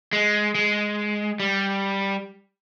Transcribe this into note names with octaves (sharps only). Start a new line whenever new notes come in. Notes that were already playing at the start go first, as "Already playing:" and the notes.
G#3
G#3
G3